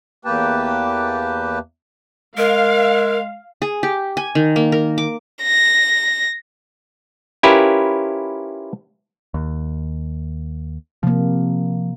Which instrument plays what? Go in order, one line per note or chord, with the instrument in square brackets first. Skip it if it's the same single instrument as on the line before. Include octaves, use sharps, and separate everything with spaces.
[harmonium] E2 A#3 G4 B4 G5 A5
[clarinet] G#3 [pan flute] A#4 [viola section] F5
[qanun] G#4
G4
G#5
D#3
A#3
A#4
D6
[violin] A#6
[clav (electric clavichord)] C#4 E4 F4 G4 A#4 B4
[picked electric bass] D#2
[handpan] C3 A#3 [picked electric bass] F3